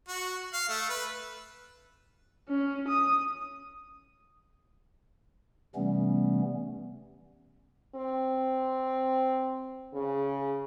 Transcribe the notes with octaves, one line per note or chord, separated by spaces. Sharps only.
F#4
F5
A3
B4
C#4
D#6
C3 E3 G3 A3 B3 C#4
C4
C#3